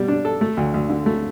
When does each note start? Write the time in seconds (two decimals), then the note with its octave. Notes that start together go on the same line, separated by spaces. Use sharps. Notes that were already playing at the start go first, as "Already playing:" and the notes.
Already playing: B2 G3
0.08 D4
0.25 A4
0.41 A3
0.57 D2
0.74 D2
0.90 D3
1.06 A3